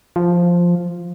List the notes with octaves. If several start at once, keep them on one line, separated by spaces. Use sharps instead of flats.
F3